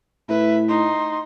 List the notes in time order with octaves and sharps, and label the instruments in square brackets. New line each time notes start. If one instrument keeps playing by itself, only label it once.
[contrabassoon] A2 [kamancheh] B4 [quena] E5
[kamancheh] D#4 [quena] C6